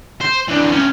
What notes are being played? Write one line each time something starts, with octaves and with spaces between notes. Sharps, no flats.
C5
E3 D4
C#4 G4